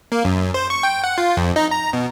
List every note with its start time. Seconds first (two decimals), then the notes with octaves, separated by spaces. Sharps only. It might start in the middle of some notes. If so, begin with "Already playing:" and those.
0.12 A#3
0.25 F#2
0.54 C5
0.70 C#6
0.83 G5
1.04 F#5
1.18 F4
1.37 F2
1.56 D#4
1.71 A#5
1.93 B2